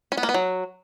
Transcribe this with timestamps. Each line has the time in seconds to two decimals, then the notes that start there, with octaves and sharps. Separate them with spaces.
0.12 C#4
0.17 B3
0.23 A#3
0.29 B3
0.34 F#3